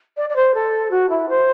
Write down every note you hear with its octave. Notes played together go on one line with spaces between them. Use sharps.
D5
D5
C5
A4
F#4
E4
C5